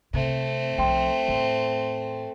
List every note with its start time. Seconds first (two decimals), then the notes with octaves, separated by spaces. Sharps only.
0.14 C3 A3 C4
0.78 B1 F3 G5 C6
1.28 E2 A2